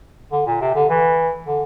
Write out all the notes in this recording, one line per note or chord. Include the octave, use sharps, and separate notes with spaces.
D3
A#2
C3
D3
E3
D3